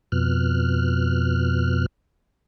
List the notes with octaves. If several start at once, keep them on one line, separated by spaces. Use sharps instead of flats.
F2 B2 F6 F#6